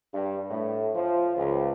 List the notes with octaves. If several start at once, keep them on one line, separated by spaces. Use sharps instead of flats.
G2
A2
F3
C#2